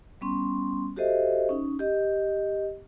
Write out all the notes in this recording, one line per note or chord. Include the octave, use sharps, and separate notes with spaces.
G3 B3 C#4 C6
F#4 G4 A4 C5 D#5 E5
C#4 D#4
G4 D#5